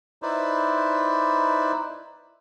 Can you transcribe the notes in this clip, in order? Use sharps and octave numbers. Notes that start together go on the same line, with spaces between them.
D#4 E4 B4 C5 D5